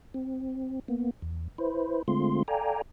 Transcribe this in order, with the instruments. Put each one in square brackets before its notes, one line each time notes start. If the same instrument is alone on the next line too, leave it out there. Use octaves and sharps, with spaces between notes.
[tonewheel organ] C4
A#3 B3
E2
E4 B4 C5
D3 G#3 A3 C4 F4 C6
A4 D5 F5 G5 G#5 A#5